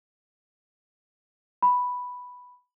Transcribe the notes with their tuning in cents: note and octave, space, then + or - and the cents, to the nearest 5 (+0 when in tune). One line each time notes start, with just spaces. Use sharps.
B5 +0